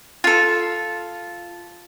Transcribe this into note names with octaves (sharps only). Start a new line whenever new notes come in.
F4 A4